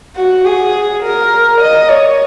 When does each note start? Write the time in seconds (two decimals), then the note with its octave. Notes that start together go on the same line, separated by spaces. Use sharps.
0.17 F#4
0.45 G#4
1.03 A#4
1.61 D#5
1.89 C#5